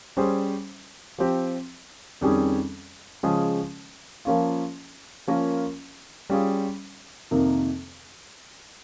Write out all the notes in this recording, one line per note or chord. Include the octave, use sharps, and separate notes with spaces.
G3 C#4 G#4 C5
F3 C4 G4
F2 D#3 G3 C#4 G#4
C#3 F3 G#3 C#4 G#4
F3 A#3 C#4 F4
F3 A#3 C#4 F4 A#4
G3 C#4 F4 G#4
F2 C3 D#3 A#3